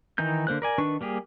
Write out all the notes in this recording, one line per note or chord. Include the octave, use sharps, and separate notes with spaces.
D#3 E3 D#4 G6
D3 A#3 C5 F#6
A#4 D5 G#5
D#3 D4 B4 C#6
G3 A#3 G4 G#4